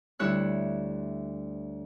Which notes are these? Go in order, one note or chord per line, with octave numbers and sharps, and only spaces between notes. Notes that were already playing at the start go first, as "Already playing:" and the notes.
D2 G3 E4 C#5 F#6